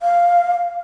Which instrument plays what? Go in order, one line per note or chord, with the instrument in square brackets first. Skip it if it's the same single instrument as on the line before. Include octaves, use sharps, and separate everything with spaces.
[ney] F5